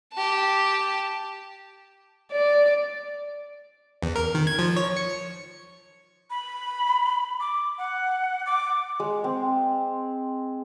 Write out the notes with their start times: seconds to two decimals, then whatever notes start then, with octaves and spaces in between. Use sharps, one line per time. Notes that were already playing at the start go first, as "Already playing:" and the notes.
0.13 G4 A5
2.32 D5
4.03 E2
4.16 A#4
4.35 D#3
4.47 G#6
4.59 F3
4.77 C#5
4.97 C#7
6.30 B5
7.40 D6
7.78 F#5
8.46 D6
9.00 G#3
9.24 C4